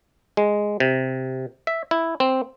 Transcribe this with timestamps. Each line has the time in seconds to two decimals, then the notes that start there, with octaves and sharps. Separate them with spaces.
0.37 G#3
0.80 C3
1.67 E5
1.91 E4
2.20 C4